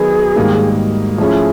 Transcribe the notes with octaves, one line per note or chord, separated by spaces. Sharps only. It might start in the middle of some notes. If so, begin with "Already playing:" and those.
Already playing: D#3 F#3 B3 D#4 G#4
G#2 D#3 G3 A#3 D#4
F3 A3 C#4 E4 G#4